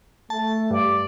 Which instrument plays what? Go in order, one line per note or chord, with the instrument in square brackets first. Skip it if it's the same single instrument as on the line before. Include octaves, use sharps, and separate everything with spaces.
[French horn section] A3 [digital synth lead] A5
[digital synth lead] G2 [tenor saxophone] D5